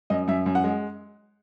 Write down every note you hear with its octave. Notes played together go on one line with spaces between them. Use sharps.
F#2 D#5
F#2 E5
F#2
F#5
G#3